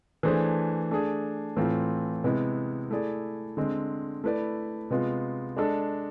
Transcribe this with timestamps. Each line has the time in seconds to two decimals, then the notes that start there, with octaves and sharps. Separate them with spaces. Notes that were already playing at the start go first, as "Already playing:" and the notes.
0.23 E3 A3 D4 G#4 C5
0.91 A3 D4 G#4
1.57 A2 E3 A3 C4 F4
2.24 C3 G#3 B3 E4
2.91 A3 E4 G#4 D5
3.57 D3 G#3 C4
4.24 A3 E4 B4 D5
4.90 C3 G#3 B3 F4
5.57 G#3 D4 A4